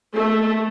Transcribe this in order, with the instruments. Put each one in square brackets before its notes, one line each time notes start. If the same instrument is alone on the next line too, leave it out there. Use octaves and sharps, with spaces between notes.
[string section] A3